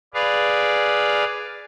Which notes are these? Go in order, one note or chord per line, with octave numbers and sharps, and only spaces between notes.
G#4 B4 D5 F5